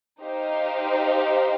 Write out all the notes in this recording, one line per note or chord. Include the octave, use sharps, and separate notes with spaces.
D#4 G4 C5 F5